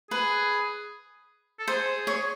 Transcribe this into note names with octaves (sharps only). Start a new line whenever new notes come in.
G#4 B4
A4
G#4 C5
C#5